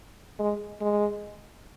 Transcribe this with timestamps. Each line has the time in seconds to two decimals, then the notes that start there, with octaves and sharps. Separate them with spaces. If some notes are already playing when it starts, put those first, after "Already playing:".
0.39 G#3
0.81 G#3